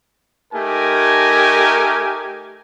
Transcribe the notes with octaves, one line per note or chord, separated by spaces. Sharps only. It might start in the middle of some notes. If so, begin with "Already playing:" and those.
A3 D#4 G4 A#4 G#5